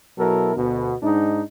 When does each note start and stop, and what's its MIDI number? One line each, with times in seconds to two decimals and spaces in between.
0.18 0.55 47
0.18 0.55 54
0.18 0.55 64
0.18 0.55 69
0.18 0.55 70
0.56 0.94 38
0.56 0.94 47
1.03 1.42 44
1.03 1.42 62
1.03 1.42 63